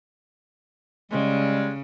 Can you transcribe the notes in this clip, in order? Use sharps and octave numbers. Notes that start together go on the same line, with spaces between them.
C#3 G3 G#3